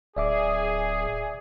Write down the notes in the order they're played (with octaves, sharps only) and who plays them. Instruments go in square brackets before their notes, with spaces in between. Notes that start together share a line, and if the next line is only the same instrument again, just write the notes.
[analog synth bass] D1 [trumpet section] G#4 [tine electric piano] D5 E5 D6